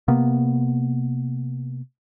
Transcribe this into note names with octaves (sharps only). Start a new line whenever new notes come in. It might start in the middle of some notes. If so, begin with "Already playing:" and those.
C3 A#3 B3